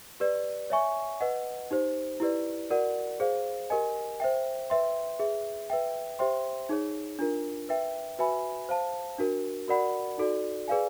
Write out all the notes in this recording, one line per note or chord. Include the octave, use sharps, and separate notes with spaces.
G4 B4 D5
C#5 E5 G#5 C#6
B4 D#5 F#5
D#4 G4 C5
E4 G4 B4 D5
F#4 A#4 D5 F#5
G#4 C5 F5
G4 A#4 D#5 G#5
C5 E5 G5
B4 E5 G5 C6
G#4 B4 E5
B4 E5 G5
G4 C5 E5 G5 C6
D#4 G#4 C#5
D4 F4 A#4
B4 E5 G5
F#4 B4 E5 G#5 B5
C5 F5 A5
D4 F#4 A#4
F#4 A#4 D5 F#5 B5
D#4 F#4 A4 D5
G#4 B4 D5 F5 G#5